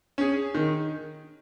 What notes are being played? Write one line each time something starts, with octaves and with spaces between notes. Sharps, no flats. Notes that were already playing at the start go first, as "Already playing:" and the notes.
C#4 G#4
D#3